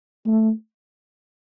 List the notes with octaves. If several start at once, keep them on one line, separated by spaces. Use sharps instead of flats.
A3